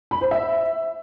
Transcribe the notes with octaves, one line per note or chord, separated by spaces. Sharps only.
B5
C5
E5